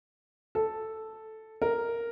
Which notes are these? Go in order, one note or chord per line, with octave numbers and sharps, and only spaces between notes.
A4
A#4